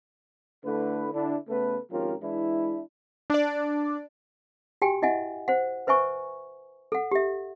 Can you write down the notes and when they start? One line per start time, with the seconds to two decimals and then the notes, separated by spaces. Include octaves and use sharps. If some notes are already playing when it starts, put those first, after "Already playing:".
0.65 D3 A3 E4 B4
1.13 D3 D4 E4
1.49 C#3 A3 B3 A4 B4
1.91 G#1 F3 C#4 F4 G4 A#4
2.22 E3 G#3 D4 E4
3.30 D4 D5
4.82 F#4 G4 G5 G#5
5.02 E4 D#5 E5 F#5 G#5
5.48 C5 F#5
5.87 B4 C5 E5 G#5 C#6
6.92 A4 F#5
7.12 G4 E5